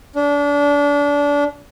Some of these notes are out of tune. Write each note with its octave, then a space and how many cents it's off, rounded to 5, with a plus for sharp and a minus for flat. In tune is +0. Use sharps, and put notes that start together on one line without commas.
D4 -30